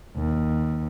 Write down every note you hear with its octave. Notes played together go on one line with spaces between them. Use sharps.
D#2